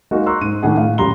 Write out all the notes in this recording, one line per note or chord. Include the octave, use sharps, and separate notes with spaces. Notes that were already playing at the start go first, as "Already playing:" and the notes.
G#3 A#3 D#4 F#4
A#5 C6 C#6 E6 F#6
G#2 D#7
A2 D#3 D4 G#4 F#5
A2 F5
D#1 F#2 G3 A#5 C6 G7